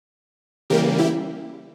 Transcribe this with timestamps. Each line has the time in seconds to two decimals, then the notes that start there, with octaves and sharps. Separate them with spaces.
0.70 C#3 E3 G3 A#3 G4 A#4
0.98 E4 G4